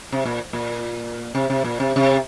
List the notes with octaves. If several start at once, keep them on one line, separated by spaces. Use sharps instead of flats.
C3
A#2
A#2
C3
C3
A#2
C3
C3